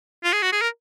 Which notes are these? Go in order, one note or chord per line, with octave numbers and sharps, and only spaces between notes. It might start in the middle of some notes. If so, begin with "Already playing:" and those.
F4
G#4
F#4
G#4
A#4